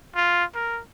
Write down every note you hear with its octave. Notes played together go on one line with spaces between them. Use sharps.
F4
A#4